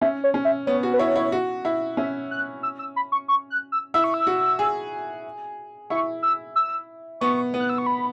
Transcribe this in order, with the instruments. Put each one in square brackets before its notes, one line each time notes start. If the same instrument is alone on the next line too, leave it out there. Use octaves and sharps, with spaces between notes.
[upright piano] C#4 [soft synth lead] E5
[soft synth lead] C#5
[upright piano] C#4
[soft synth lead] E5
[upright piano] B3 [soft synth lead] C#5
[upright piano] F#4
[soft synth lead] B4
[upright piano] E4 [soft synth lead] C#5
[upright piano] E4
F#4
E4
[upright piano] C#4 [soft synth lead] E5
[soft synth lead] F#6
E6
E6
B5
C#6
C#6
F#6
E6
[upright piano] E4 [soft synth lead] E6
[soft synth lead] C#6
E6
[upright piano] F#4
G#4
[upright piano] E4 [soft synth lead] C#6
[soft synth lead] E6
E6
[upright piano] B3 [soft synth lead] C#6
[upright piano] B3
[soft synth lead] F#6
E6
C#6
B5